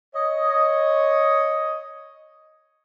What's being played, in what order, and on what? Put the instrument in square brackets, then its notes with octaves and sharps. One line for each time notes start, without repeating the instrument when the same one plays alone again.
[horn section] C#5 D#5